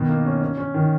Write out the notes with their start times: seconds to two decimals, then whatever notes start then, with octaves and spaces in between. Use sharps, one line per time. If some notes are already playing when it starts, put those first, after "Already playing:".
Already playing: B2 D#3
0.09 A#3
0.25 C#4
0.42 C#4
0.57 C#4
0.74 D#3